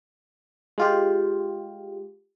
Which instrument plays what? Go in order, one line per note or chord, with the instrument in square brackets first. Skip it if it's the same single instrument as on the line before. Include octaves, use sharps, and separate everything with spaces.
[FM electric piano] G#3 F4 G4